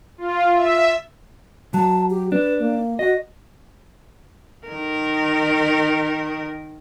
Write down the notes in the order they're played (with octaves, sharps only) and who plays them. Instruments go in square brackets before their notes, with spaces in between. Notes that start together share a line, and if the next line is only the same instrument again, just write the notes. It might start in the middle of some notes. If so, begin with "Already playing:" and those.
[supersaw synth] F4
E5
[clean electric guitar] F#3 [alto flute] A5
[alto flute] G4
[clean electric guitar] D4 [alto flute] B4
[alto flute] A#3
[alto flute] F#4 [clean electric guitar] D#5
[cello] D#3 A#4